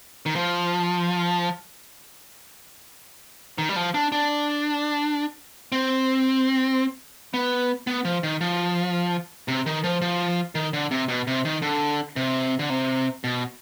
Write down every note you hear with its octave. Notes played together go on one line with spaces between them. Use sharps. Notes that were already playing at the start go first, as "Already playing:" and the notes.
D#3
F3
D#3
G3
F3
D4
D4
C4
B3
B3
F3
D#3
F3
C3
D#3
F3
F3
D#3
D3
C3
B2
C3
D#3
D3
C3
D3
C3
B2